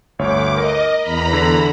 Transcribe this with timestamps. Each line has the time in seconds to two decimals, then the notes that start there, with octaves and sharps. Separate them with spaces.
0.19 G1 D2 C#5 D6
0.58 A#4 D#5
1.01 E2 A#5 B5
1.33 D3